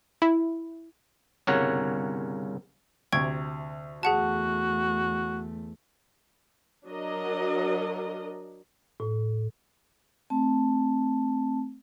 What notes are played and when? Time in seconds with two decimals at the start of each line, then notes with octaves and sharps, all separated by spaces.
0.22 E4
1.47 G1 C2 C#3 A#4 C#5 F#5
3.12 D2 C3 G5 C#6 G#6
4.03 E2 A3 F#4 G#4 F#5 A5
6.85 F#3 D4 A#4 D#5
9.00 A2
10.30 A3 C4 A5